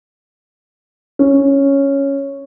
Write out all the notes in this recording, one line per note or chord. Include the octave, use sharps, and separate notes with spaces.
C#4